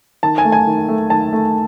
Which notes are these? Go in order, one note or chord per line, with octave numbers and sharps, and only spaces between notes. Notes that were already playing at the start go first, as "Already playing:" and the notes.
D#3 A5
G#5
A3
G#5
D#3
A3
D#3 A5
A3